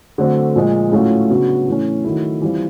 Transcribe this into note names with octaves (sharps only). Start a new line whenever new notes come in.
D3 F#3 A3 C4
A#2 F3 G#3
A2 F#3 A3 C#4 F4
C#3 F#3 B3 D4 F#4
A2 E3 A3 C#4
D#3 F#3 A3 C#4 E4
E3 G3 C4 F4